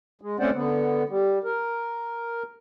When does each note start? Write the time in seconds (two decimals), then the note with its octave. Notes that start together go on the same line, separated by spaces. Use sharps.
0.21 G#3
0.40 A3 C4 C#4 C5 D5 F#5
0.54 D3 B3
1.09 G3
1.44 A#4